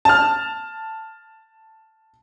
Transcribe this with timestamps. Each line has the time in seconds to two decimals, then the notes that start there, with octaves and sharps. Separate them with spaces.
0.05 A5 F6